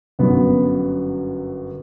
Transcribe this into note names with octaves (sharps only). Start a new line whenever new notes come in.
G1 F#2 F#3 B3